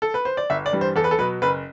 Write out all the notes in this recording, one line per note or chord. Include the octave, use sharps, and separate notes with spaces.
A4
B4
C5
D5
G1 E5
D5
G2 E3 G3
C5
E2 A4
B4
A4
B2 F#3 B4
F#1 B4